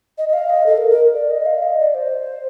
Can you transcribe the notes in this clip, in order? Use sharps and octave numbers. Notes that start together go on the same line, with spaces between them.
D#5
D#5
F5
D#5
A4
A#4
A#4
D5
D#5
F5
D#5
D5
C5